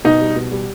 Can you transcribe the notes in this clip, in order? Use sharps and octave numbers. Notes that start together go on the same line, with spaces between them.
B2 D#4
G3
B2
G3